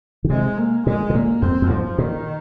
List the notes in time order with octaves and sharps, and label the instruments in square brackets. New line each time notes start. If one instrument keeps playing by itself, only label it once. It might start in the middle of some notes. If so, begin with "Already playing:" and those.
[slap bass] D#3
[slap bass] C3 [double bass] G#3
[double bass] A#3
[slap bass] A#2 [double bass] G#3
[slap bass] C3
[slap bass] A#2 [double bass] A#3
[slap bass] F2 [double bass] C4
[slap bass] F2
[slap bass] G#2 [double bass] F3
[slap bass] A#2 [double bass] D#3